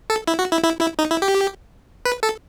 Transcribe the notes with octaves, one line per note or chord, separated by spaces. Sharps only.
A4
E4
F#4
E4
E4
E4
D#4
E4
G4
B4
A4